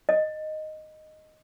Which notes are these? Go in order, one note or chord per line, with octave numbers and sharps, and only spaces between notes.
D#5